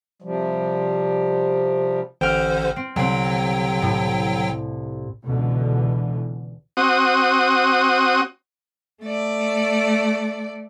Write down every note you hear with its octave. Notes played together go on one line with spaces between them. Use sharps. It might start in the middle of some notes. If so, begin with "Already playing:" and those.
C3 F3 G3
A1 D3 C5 G5 F6
C4
C2 D3 F#3 C4 G5
A2
C#2 B2 D3 E3
C4 F#4 D#6
A3 D5